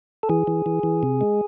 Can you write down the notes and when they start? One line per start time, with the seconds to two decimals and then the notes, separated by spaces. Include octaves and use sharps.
0.23 A4
0.29 E3 G#4
0.47 E3
0.66 E3
0.83 E3
1.03 C3
1.21 G#3